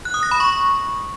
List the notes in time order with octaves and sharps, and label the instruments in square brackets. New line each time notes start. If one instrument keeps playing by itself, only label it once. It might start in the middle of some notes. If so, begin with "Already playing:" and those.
[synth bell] F#6
D#6
A#6
B5
C#6